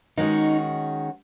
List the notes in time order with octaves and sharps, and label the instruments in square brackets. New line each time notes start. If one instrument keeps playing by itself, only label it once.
[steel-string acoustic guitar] D#3 G#3 C#4 F#4 [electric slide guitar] D#4